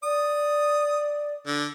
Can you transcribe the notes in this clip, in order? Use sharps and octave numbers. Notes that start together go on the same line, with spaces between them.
D5 D#6
D3